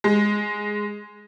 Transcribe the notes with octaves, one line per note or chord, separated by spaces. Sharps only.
G#3